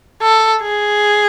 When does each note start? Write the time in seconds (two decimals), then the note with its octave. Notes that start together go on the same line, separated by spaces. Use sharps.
0.22 A4
0.62 G#4